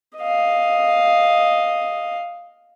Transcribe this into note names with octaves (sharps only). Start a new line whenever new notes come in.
D#5 F5